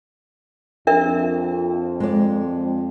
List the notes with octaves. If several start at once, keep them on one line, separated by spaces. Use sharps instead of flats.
F2 D4 A#4 E5
G#3 D5